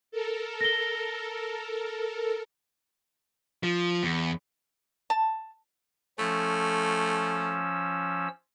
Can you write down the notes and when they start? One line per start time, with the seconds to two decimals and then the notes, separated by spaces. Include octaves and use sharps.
0.11 A4 A#4
0.61 A#6 G7
3.63 F3
4.03 E2
5.10 A5
6.19 F3 A3 C#4 E6